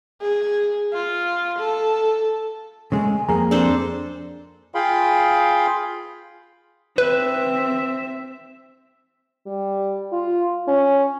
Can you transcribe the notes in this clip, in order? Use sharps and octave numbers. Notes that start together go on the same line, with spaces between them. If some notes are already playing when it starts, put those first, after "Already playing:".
G#4
F4
A4
C#3 G#3 A3 G#5
F2 A#3 G#4 G#5 A#5
C4 D4 A4 C5
F4 G#4 F5 G5 B5 C6
C4 B4 E5
G3
F4
C#4